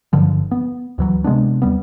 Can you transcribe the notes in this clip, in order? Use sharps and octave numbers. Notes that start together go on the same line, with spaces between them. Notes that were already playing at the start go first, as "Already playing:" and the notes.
F#1 G2 D3 F3
B3
D2 E3 F#3
C3 G#3 B3 D4
D#2 G3 B3